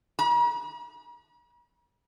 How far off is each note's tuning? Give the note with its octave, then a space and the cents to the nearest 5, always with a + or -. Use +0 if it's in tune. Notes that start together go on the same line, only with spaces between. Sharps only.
A#5 +40